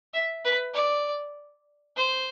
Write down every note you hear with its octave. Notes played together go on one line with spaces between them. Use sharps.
E5
B4
D5
C5